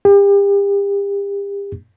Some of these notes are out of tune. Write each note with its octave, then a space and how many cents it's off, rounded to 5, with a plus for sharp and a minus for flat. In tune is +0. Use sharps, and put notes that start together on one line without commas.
G4 +35